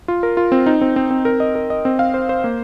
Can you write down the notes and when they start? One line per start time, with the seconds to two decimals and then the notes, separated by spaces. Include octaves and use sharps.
0.08 F4
0.23 A#4
0.37 F4
0.52 C4
0.66 D#4
0.81 C4
0.96 C4
1.10 C4
1.25 A#4
1.40 D#5
1.55 A#4
1.70 D#5
1.85 C4
1.99 F5
2.14 C5
2.29 C5
2.44 A#3